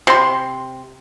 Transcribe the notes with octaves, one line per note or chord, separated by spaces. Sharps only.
C3 C6